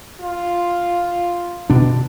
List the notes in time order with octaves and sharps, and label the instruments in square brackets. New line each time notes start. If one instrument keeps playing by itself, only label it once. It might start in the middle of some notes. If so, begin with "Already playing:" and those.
[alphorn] F4
[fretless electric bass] B2 D4